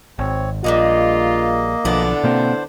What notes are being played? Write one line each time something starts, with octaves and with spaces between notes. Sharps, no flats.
G#1 C4 C#5
A#1 G3 G#3 A#3 D#4 F4 D#5
B1 D3 F3 B3 D4 E4
B2 A#3 C4 C5